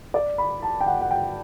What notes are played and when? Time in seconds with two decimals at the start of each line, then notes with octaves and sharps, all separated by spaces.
0.14 D5
0.38 B5
0.62 A5
0.80 G5
0.86 F#5
1.01 F#5
1.11 G5